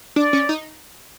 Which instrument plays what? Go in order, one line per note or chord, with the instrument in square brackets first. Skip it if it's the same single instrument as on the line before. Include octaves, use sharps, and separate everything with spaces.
[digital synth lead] D4 [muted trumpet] D5
[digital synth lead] C#4
D#4